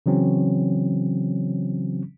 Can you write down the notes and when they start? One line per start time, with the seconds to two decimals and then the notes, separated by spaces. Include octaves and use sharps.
0.06 C#3 E3 F#3 C4 C#4